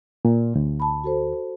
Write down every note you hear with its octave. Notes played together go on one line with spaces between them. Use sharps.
A#2
D2
A5 B5
F#4 A4 C5